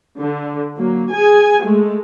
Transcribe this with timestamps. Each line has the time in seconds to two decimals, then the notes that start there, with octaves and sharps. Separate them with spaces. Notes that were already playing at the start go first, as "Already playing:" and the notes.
0.18 D3
0.76 F#3 A#3
1.11 G#4 G#5
1.63 G#3 A3